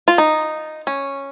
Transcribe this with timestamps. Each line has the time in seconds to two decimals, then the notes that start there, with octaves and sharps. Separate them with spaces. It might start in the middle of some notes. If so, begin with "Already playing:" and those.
0.08 F4
0.18 D#4
0.87 C#4